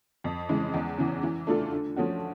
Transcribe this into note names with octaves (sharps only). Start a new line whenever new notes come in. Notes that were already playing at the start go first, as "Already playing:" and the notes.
F2
C#3 E3 G#3
E2
C#3 E3
E3
A3 D4 F4 A4
D3
F3 A3 C#4 F#4